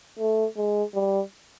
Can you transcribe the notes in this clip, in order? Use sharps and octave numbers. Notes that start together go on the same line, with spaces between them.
A3
G#3
G3